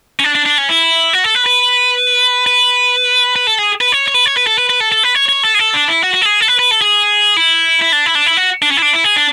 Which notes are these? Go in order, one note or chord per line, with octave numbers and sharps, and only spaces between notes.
C#4
D4
D4
D4
C#4
E4
F#4
A4
B4
B4
B4
B4
A4
G#4
B4
C#5
C#5
B4
C#5
B4
A4
B4
B4
A4
A4
B4
C#5
C#5
A4
G#4
A4
D4
E4
F#4
F#4
A4
G#4
A4
B4
B4
A4
G#4
E4
E4
D4
E4
D4
E4
F#4
D4
C#4
E4
D4
E4
G#4
D4